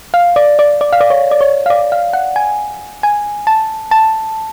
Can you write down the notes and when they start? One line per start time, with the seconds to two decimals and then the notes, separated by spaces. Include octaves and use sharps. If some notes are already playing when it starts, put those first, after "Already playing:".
0.14 F5
0.36 D5
0.59 D5
0.81 D5
0.93 F5
1.01 D5
1.10 C#5
1.31 D5
1.41 C#5
1.66 F5
1.70 D5
1.92 F5
2.13 F#5
2.36 G#5
3.03 G#5
3.47 A5
3.91 A5